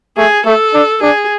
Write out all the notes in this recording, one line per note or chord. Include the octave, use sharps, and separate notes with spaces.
A3 G#4
A3 A4
D4
D4 G#4